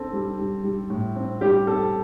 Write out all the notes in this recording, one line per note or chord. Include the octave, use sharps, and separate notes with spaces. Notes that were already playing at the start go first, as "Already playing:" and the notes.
Already playing: C4 A4
G3
G3
G3
A2
C4
G3 G4
C4 A4